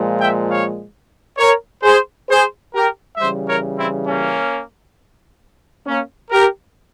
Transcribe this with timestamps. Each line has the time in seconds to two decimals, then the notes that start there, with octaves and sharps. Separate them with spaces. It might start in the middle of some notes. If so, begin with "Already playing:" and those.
Already playing: A#2 F3 G#3
0.19 E5 G5
0.49 C#5 F5
1.38 A#4 C#5
1.82 G#4 C5
2.28 G#4 C5
2.72 G4 A#4
3.17 C#3 E3 G3 C5 E5
3.47 A#4 C#5
3.77 C4 E4
4.07 A#3 C#4
5.85 A#3 C#4
6.30 G4 A#4